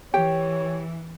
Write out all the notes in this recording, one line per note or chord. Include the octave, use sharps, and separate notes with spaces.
E3 G4 C#5 G5